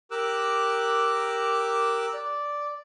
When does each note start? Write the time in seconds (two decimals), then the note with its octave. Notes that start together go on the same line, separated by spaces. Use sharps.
0.11 G4 A#4 D6 E6 F#6
2.14 D5